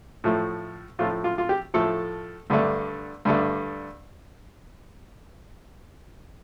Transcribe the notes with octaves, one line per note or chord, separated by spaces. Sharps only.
A2 F3 A3
A2 F3 A3 F4
F4
F4
G4
A2 F3 A3 A4
G2 D3 A3
G2 D3 A3